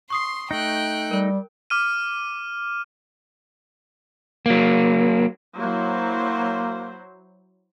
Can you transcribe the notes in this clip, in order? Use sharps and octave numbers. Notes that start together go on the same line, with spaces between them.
C6 C#6 D#6 C7
A3 D#4 G5 F#6
G3 A#4
D6 F6 D#7
F#3 A#3
F#3 A#3 E4 C5